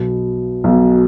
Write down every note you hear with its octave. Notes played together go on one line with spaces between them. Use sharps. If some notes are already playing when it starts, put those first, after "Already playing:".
Already playing: B1 B2
B1 B2